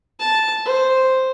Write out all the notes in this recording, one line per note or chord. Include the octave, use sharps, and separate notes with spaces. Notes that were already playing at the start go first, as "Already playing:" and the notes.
A5
C5